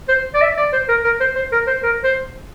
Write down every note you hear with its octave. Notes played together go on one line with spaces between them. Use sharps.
C5
D5
E5
D5
C5
A#4
A#4
C5
C5
A#4
C5
A#4
C5